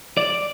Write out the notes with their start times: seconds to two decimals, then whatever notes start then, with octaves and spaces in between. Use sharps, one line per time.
0.17 D5